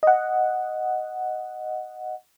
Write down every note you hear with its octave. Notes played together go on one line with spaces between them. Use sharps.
D#5 F#5